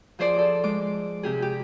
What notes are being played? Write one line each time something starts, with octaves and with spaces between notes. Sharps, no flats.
F3 G#4 C5 D5
A4 D5
G#3 D6
C3 G4 G#4
G4